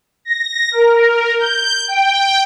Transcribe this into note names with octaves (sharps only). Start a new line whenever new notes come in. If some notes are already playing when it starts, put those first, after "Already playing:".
A#6
A#4
G6
G5